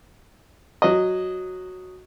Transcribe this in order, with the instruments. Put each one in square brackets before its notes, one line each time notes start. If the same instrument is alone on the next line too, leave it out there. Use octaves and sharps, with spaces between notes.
[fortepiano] F#3 D#5